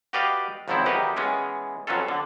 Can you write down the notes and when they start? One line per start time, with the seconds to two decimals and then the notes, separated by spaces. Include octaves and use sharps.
0.13 F#4 G4 B4 D5 D#5 F5
0.68 G#1 F3 F#3 B3 C4 E4
0.86 E2 D#3 D#4 F#4 G4 B4
1.16 E3 G#3 B3 C#4
1.87 F2 F#3 B3 C#4 F4 A4
2.08 D3